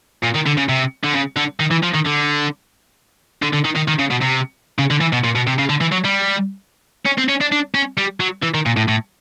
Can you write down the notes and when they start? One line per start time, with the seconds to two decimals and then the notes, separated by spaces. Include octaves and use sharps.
0.23 A#2
0.34 D#3
0.46 D3
0.57 C#3
0.69 C3
1.04 D3
1.14 C#3
1.37 D3
1.60 D#3
1.71 E3
1.83 F3
1.94 D#3
2.05 D3
3.42 D3
3.53 D3
3.65 D#3
3.76 D#3
3.88 D#3
3.99 C#3
4.10 B2
4.21 C3
4.79 C#3
4.91 D3
5.01 E3
5.13 B2
5.24 A#2
5.35 B2
5.47 C3
5.59 C#3
5.70 D3
5.81 E3
5.92 F#3
6.04 G3
7.06 C#4
7.18 C4
7.29 C#4
7.41 D4
7.52 D4
7.75 C#4
7.98 G3
8.20 F#3
8.43 E3
8.54 D#3
8.66 A#2
8.77 A2
8.88 A2